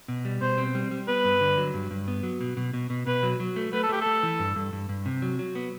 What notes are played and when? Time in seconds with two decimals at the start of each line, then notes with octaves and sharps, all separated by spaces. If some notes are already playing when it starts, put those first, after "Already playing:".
0.08 B2
0.25 G3
0.41 B2 C5
0.58 C4
0.75 G3
0.91 G3
1.08 B3 B4
1.25 G2
1.41 D3
1.58 F#3
1.74 G2
1.91 G2
2.08 B3
2.23 F#3
2.41 B2
2.57 B2
2.73 B2
2.90 B2
3.07 B2 B4
3.23 F#3
3.40 F#3
3.56 A3
3.73 A3 B4
3.83 A4
3.89 A3 G4
4.01 A4
4.06 A3
4.23 E3
4.39 G2
4.56 G2
4.73 G2
4.89 G2
5.06 C3
5.22 F#3
5.39 F#3
5.55 B3